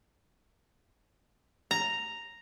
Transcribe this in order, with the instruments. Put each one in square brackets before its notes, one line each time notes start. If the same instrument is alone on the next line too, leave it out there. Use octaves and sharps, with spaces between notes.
[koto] A#5